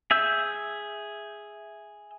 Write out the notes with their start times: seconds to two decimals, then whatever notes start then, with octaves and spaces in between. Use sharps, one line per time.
0.11 G#4 E5 E6 G6